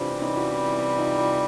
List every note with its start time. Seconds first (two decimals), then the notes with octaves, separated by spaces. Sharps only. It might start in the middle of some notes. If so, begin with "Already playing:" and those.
Already playing: C3 E3 G3 C4 D4 F4 G4
0.11 D4
0.21 C#4 D#4
0.36 E4 F#4
0.98 D#4 F4
1.17 D#4 F4